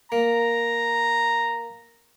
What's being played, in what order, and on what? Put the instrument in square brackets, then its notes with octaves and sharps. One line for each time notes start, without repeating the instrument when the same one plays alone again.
[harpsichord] A#3 [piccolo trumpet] A#5